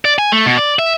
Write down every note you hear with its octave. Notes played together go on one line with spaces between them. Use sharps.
D5
G#5
A3
B2
D5
E5